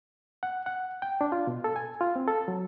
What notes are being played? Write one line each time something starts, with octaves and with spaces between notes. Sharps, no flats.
F#5
F#5
G5
D4
F4
B2
A4
G#5
F4
C4
A4
F#3